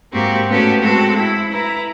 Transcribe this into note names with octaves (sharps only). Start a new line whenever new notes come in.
G#2 A#3 C4 F#4 G4
A2 B3 C#4 F#4 G4 A4
G#3 C4 F#4 A4
E4
E4 B4 A#5